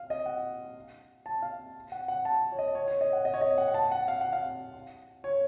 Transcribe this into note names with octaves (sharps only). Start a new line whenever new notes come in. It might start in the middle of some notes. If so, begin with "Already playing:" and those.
Already playing: F5
D#5
F#5
A5
F5
F#5
F#5
A5
C#5
D#5
C#5
C#5
D#5
F#5
D#5
C#5
D#5
F#5
F#5
A5
F#5
F5
F#5
F5
C#5